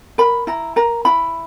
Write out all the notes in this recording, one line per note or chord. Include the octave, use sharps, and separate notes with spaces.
A#4 B5
E4 A#5
A#4 A#5
E4 B5